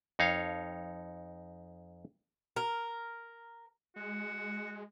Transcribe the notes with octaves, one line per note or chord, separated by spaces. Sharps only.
F2 D#4 C#5 F5
A#4
G#3 F#4